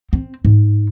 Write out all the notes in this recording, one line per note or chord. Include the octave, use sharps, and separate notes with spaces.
C4
G#2